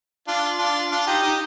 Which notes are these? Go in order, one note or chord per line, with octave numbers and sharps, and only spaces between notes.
D4 F4
D4 F4
D4 F4
D#4 G4
D#4 G4